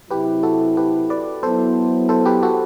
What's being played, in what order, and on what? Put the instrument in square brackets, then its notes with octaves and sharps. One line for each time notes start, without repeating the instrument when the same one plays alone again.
[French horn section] C3 F#3 C4 E4 [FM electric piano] G4 B4
[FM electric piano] F#4 A4
G4 B4
B4 D5
[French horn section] F#3 B3 E4 [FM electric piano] A4 C5
[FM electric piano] A4 C5
G4 B4
F#4 A4